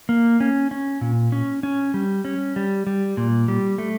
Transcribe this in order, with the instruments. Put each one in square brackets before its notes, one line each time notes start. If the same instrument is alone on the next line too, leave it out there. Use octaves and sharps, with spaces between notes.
[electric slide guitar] A#3
C#4
C#4
A#2
C#4
C#4
G3
C#4
G3
G3
A#2
G3
A3